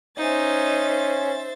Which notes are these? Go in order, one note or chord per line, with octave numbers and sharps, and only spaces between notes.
C#4 D#4 C5 E5 A6